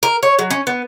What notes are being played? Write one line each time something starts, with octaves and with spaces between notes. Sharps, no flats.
A#4
C#5
F#3
C#4
B3